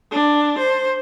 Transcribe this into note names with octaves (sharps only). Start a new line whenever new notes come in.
D4
C5